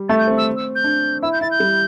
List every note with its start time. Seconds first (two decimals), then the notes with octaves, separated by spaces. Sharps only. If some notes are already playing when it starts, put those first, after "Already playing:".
Already playing: G3
0.09 A3 A6
0.18 G6
0.27 C4
0.37 E6
0.56 E6
0.75 G6
0.84 D4
1.22 E4 E6
1.32 G6
1.41 E4 A6
1.51 G6
1.60 G3